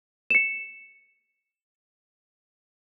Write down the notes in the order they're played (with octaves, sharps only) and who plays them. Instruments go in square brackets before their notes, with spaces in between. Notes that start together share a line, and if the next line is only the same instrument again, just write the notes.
[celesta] C#7 E7